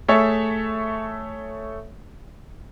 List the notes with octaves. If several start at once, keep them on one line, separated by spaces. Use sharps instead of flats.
A3 G#4 A4 C#5 E5